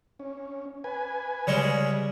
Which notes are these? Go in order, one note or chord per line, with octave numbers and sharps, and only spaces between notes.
C#4
B4 G#5
C#3 G3 G#3